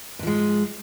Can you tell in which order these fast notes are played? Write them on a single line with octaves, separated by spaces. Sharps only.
G#2 F3 G#3